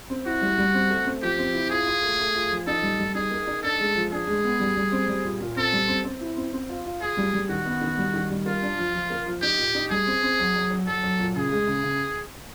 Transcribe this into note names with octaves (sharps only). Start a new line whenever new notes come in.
C4
E4 F#4
G3
G3
C4
A3
C4
F3 G4
C4
E4
F4 G#4
F4
A3
A3
F4
F3
D#4 A4
G3
G3
D#4 G#4
A#3
D#4
D4 A4
G#3
F3
D4 G#4
G#3
B3
G3
G3
C4
G3
A#2
A#2
C4 A4
G3
C4
C4
E4
C4
C4
F4
F4
F4 G#4
G3
G3
D#3 F#4
B3
D#3
G3
D#3
G3
A#3 F4
D4
F3
F3
A#3
F3
D#4 G4
A#2
D#4
G3 G#4
C4
C4
F#3
F#3
F#3
F#3 A4
F#3
A#2
C#3 G#4
G#3
C#3
C#3